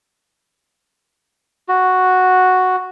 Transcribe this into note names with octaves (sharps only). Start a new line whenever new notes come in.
F#4